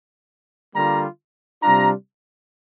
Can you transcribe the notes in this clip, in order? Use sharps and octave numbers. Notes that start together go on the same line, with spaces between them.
D3 G3 A#3 F4 A#5
C3 G3 D4 F4 A#5